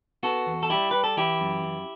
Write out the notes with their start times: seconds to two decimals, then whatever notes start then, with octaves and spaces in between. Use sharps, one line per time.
0.23 B3 F#4 A4
0.47 E2
0.63 A4
0.70 G3 E4 G4
0.91 G3 B4
1.04 A4
1.17 E3 E4 G4
1.41 F#2
1.64 F#2